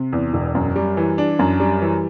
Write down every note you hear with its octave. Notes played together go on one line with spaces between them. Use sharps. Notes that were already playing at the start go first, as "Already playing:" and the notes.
Already playing: C3
E2
E1
F#2
G3
E3
D4
F#2
G3
E3